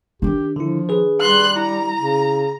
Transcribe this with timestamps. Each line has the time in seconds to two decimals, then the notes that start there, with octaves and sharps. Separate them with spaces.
0.22 D#3 D4 G4
0.56 D3 F3 E4
0.89 G#4 B4
1.21 G3 C6 F#6
1.56 E4 A#5
1.96 C#3